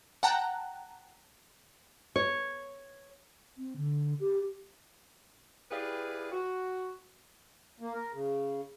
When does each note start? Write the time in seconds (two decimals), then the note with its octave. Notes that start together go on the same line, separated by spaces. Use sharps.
0.23 F#5 G5 A5 A#5 F#6
2.16 C#5
3.57 C4
3.76 D3
4.20 G4
5.71 E4 G4 G#4 B4 D5 F5
6.31 F#4
7.80 A#3
7.94 A#4
8.13 C#3